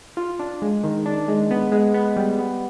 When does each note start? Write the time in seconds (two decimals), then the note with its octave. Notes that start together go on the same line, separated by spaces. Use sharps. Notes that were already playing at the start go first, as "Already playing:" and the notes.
0.17 F4
0.39 D4
0.62 G#3
0.84 D#3
1.06 D4
1.28 G#3
1.51 B3
1.72 G#3
1.94 B3
2.16 G3
2.39 B3